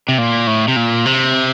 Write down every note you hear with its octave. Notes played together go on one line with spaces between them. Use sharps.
C3
A#2
A2
C3
A#2
C3